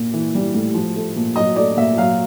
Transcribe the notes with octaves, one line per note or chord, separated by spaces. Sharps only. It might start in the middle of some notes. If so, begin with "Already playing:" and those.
Already playing: A#2
E3
G3
A2
F3
A3
A#2
F#3 D#5
A3 D5
A#2 E5
F#3 F5